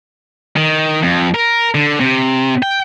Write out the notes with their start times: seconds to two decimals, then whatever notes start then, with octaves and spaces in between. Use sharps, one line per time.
0.56 D#3
1.03 F2
1.34 A#4
1.75 D3
2.00 C3
2.63 G5